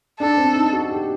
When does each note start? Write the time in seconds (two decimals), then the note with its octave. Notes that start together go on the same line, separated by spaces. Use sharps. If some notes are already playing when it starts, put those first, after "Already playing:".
0.20 D4 A4
0.37 C4
0.55 D#4
0.73 F#4
0.90 G4